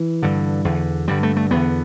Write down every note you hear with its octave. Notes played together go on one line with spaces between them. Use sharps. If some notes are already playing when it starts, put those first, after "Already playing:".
Already playing: E3
G2 D3
E2 D3
G2 D3 G3
A3
A3
E2 D3 B3